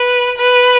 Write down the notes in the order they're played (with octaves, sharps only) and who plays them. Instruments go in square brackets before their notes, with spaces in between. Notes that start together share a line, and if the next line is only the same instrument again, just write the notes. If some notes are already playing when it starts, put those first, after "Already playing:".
Already playing: [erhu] B4
B4